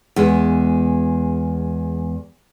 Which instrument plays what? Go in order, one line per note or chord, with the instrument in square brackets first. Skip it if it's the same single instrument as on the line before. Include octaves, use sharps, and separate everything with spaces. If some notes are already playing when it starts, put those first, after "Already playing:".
[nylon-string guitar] E2 G#3